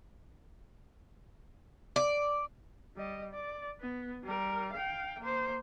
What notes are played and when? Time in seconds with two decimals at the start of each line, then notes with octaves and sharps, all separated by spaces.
1.96 D5
2.97 G3 D#5
3.34 D5
3.81 B3
4.24 G3 A#4
4.73 F5 G5
5.20 A#3 C5